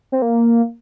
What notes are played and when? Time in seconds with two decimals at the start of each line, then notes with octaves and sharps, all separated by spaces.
0.12 C4
0.22 A#3